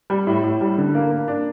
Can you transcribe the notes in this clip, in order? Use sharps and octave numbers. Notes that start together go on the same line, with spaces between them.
G3
A2
A2
G3
D3
A#3
A#3
D4